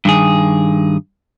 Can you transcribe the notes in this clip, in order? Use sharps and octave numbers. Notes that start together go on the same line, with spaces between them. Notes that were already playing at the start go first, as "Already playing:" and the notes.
G2 D#3 G#4